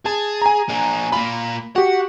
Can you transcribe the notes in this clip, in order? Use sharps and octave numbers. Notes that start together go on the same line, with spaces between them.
G#4 A5
G#5 A#5
A#3 D4
A#3 F4 B5
F#4 G4 F#5